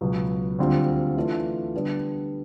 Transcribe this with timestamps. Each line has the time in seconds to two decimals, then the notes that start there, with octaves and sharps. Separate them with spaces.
0.01 C#2 B2 F#3 B3
0.59 D2 D3 G3 C4 F4
1.16 E3 A3 D4 F4
1.74 D3 G3 B3 D4